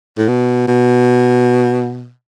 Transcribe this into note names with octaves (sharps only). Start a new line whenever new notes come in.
A2
B2
B2